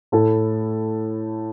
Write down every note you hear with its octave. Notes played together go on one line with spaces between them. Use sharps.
A2 A3 E4 A4